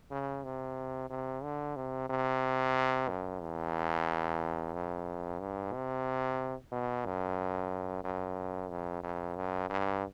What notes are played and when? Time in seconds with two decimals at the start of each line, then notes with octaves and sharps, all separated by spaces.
0.11 C#3
0.44 C3
1.10 C3
1.43 D3
1.76 C3
2.10 C3
3.08 F#2
3.42 E2
4.74 F2
5.40 G2
5.72 C3
6.72 B2
7.05 F#2
8.04 F#2
8.70 F2
9.03 F2
9.36 F#2
9.69 G2